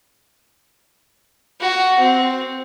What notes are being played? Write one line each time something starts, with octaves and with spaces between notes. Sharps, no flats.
F#4
C4